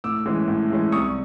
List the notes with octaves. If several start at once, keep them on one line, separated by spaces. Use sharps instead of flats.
A2 D6 E6
E3 G#3 C#4
A2
E3 G#3 C#4
C2 C#6 D#6